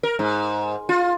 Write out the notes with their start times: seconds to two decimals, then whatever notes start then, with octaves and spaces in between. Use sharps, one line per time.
0.03 A#4
0.19 G#2
0.89 F4